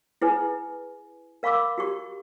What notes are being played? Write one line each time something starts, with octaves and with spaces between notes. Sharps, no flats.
E4 G#4 B4 G#5
A#4 F5 B5 C#6 D6 E6
F#4 G4 C#6